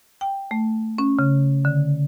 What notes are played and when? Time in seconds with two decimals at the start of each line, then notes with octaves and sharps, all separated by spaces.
0.21 G5
0.51 A3
0.98 C#4
1.19 C#3
1.65 D3